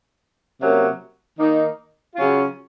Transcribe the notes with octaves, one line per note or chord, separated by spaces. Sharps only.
C3 F#3 A#3 C#4
D#3 A#3 D#4
C#3 F#3 C#4 F4